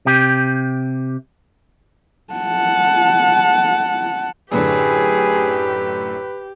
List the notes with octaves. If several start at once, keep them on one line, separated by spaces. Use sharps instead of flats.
C3 G4
F#5 A5
F#2 A2 D3 G4 G#4 B4